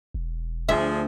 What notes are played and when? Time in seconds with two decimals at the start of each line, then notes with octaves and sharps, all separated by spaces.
0.14 E1
0.69 D2 F3 D4 G#4 E5